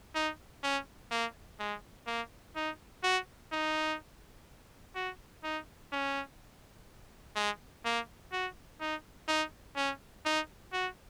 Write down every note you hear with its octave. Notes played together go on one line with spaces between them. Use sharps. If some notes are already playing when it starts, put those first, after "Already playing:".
D#4
C#4
A#3
G#3
A#3
D#4
F#4
D#4
F#4
D#4
C#4
G#3
A#3
F#4
D#4
D#4
C#4
D#4
F#4